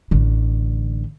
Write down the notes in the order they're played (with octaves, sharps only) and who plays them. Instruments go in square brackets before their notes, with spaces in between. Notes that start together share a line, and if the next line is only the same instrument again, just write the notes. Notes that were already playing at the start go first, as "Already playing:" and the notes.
[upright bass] A1 D3